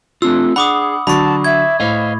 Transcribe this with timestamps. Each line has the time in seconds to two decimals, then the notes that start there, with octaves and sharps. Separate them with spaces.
0.22 A3 C4 D4 F4 E6
0.56 D4 G#4 F#5 B5 D6 D#6
1.07 D3 F#3 D4 A5 B5 C#6
1.44 E5 G#6
1.80 A2 C5 D#5 F5 F7